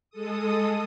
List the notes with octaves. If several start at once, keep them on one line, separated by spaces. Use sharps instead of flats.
G#3 A4 D#6